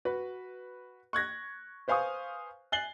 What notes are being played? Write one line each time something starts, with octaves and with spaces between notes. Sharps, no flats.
F#4 B4
C#6 F#6 G#6 A#6
B4 C5 F5 G#5 C#6 D#6
G#5 F#6 A6 C7 F#7 G7